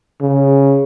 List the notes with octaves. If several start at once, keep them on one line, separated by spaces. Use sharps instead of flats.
C#3